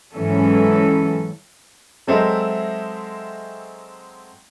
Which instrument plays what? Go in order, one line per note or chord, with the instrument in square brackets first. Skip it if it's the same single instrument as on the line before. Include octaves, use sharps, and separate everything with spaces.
[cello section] G#2 E3 F#3 C#4 A4
[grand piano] F#3 G#3 C4 A4 A#4 E5